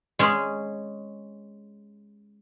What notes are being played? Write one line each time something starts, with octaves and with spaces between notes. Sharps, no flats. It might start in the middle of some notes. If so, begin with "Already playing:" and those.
G#3 C#4 G#4